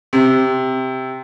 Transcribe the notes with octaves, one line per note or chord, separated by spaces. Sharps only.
C3